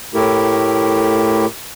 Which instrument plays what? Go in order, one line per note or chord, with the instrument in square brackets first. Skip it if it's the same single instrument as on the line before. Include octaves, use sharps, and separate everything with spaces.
[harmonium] A2 A3 E4 G4 A#4